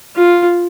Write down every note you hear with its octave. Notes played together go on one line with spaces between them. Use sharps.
F4